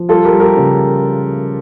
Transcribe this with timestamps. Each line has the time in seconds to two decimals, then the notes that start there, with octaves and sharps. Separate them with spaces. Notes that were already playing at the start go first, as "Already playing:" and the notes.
Already playing: F3
0.09 G3 F4 A4
0.24 G4 A#4
0.33 G3
0.40 G4 A#4
0.57 C#3